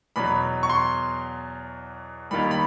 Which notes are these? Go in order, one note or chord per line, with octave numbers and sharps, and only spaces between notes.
E2 B2 F#3 B5
C#6
C6
D#2 D#3 G3 B5
B5